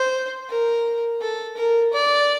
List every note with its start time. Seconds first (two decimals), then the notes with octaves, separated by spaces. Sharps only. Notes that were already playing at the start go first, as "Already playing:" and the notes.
Already playing: C5
0.49 A#4
1.21 A4
1.57 A#4
1.93 D5